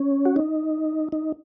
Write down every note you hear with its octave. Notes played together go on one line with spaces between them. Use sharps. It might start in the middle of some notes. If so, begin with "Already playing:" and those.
Already playing: C#4
F#4
D#4
D#4